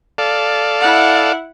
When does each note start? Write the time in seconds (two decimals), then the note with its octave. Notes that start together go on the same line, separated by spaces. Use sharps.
0.18 A4 D5 F5
0.80 E4 F#5